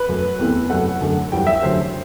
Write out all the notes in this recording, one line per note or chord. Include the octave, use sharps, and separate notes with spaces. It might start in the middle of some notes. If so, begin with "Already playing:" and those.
Already playing: B4
F#2 F#3 A3
E2 C3 E3 A3
F#2 F#3 A3 F#5
F#2 D3 A3
F#2 E3 G3 G5
E5
F#2 D3 F#3 A3 C5